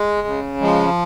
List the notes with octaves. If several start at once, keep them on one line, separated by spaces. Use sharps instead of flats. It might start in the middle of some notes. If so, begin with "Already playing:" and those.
Already playing: G#3
C#3
F3 G#3